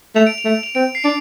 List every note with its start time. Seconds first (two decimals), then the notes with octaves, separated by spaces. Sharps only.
0.15 A3 F7
0.27 D7
0.38 F7
0.45 A3
0.63 F7
0.75 C4 D7
0.95 C7
1.04 D4 D7